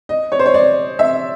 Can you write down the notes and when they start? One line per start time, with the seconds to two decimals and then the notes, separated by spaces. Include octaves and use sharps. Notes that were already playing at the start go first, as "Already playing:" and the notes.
0.09 D#5
0.32 C#5
0.39 C5
0.46 C#5
0.54 D5
0.99 E5